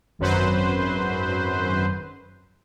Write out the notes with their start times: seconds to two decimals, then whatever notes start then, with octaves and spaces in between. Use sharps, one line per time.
0.19 G#1 F#2 F#3 B4 C5